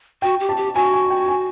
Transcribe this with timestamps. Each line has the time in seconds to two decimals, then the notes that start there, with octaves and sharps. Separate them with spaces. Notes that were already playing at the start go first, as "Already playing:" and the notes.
0.22 F#4 G5
0.40 G4
0.49 A5
0.57 G4
0.75 F#4 G#5
0.93 G#5
1.10 G5
1.28 G#5